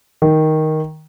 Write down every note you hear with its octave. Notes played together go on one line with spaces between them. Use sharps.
D#3